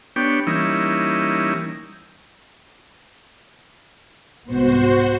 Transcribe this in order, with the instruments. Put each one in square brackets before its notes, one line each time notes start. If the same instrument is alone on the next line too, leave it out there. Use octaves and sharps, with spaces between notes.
[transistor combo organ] B3 D4 G4 C#5 G5
E3 G3 A#3 C#4 D#4 E4
[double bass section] C2 G#2 B3 [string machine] F#4 C5